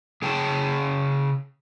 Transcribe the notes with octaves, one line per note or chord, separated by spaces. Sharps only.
C#3 G#4 C#5 G5 A5